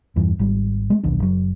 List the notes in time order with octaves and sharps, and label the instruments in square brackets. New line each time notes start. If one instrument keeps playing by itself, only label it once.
[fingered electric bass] E2 G2 E3
G#1 G3
G#3 A3
D#1 B1 D#3 D4
F#1 F#3